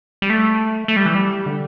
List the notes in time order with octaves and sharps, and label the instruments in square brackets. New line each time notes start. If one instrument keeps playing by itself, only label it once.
[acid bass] G3
A3
A3
G3
E3
G3
D3